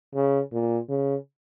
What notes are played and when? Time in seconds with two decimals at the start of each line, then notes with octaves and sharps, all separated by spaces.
0.15 C#3
0.53 A#2
0.89 C#3